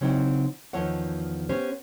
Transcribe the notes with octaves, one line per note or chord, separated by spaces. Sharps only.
C#3 F#3 C4 D#4 E4 G5
E2 D#3 F3 E4 C#5 F#5
B3 C#4 G4 C5 C#5